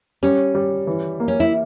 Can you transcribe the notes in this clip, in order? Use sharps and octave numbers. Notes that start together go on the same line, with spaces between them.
G3 C#4
G3
E3
A#3
C#4
E4